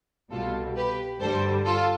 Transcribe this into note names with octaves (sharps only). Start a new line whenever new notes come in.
C2 B2 G3 F4 A4
G4 B4
G2 D3 G3 A4 C5
F4 A4